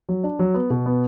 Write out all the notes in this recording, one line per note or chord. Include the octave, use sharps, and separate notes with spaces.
F#3
D4
F#3
B3
B2
B3